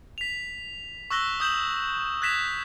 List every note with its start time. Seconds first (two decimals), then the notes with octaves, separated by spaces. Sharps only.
0.18 B6 F7
1.11 C#6 E6 F#6 A#6 G7
1.40 D#6 G6 E7 F#7
2.22 F#6 G#6 A#6 B6 E7 F7